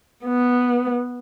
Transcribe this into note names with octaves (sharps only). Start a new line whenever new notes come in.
B3